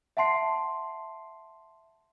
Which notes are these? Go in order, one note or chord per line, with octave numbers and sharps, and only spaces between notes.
E5 F#5 A5 C6 C7